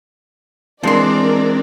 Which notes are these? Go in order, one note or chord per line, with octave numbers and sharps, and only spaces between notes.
E3 F3 G#3 C4 D4 A#4 D5 C6